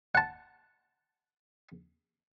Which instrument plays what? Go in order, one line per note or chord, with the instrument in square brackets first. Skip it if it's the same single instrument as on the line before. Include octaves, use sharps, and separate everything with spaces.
[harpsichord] F#5 A5